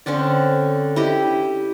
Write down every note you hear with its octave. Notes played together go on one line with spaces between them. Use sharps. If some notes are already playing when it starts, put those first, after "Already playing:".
D3 C4 C#4 D5
E4 G4 D#5